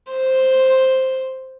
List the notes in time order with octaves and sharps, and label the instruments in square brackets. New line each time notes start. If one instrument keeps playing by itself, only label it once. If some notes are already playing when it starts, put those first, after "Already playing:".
[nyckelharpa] C5